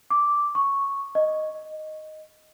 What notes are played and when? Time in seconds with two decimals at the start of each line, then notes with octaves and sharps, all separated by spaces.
0.10 D6
0.55 C#6
1.15 D#5